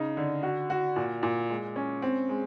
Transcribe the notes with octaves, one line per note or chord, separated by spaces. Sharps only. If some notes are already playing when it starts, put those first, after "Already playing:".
Already playing: C#3 D#4
D3
F#4
F#4
A#2
A#2
G#3
C#4
C4
G#3